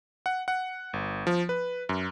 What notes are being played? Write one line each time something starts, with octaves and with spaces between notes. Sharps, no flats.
F#5
F#5
G1
F3
B4
F#2